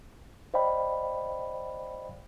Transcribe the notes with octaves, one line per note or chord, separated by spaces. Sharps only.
C5 D5 D#5 F5 G5 B5